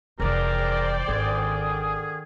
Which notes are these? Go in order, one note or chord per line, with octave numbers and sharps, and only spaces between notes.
F1 E3 G#4 A#4 C5 D5 G5
G#1 D3 D#3 G#4